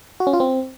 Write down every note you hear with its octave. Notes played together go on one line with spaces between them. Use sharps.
F#4
C#4
F4
C4